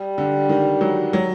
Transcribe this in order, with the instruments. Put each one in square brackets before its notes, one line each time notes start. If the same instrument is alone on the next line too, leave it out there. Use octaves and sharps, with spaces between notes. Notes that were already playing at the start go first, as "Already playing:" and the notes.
Already playing: [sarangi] G3
[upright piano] D3
D#3
F#3
F#3